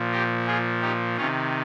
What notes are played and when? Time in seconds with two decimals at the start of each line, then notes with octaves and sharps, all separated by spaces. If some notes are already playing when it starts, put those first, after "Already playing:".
Already playing: A#2 F3
0.12 G4 A#4
0.47 F4 G#4
0.81 D#4 G4
1.17 C3 D#3 C#4 F4